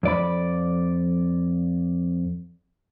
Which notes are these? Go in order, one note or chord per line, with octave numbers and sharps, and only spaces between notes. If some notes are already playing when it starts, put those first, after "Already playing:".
F2 D5 B5